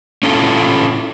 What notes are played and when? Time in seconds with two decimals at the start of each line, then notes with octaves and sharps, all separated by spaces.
0.23 C#4 E4 F4 A4